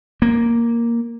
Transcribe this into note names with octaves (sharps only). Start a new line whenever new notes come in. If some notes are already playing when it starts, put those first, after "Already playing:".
A#3